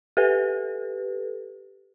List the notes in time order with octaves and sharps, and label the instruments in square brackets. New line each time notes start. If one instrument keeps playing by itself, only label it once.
[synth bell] G4 A4 B4